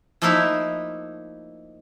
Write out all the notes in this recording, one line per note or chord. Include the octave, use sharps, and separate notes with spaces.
F3 A3 A#3 D#4 E4 A#4